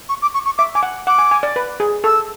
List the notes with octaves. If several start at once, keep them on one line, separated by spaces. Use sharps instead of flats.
C#6
D6
C#6
C#6
E5 D6
G#5 D6
F#5
F#5 D6
G#5
G#5
D5
B4
G#4
A4 E6